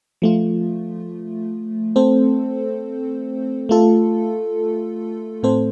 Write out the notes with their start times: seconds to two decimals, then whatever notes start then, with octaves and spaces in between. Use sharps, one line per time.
0.22 F3 A3 F4
1.96 A3 C4 A4 C5
3.69 A3 F4 A4
5.43 A2 A3 C4 A4 C5